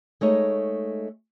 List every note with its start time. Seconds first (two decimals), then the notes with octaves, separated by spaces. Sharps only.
0.21 G#3 A3 D#4 C#5